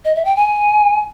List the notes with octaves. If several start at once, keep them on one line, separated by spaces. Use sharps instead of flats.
D#5
E5
G5
G#5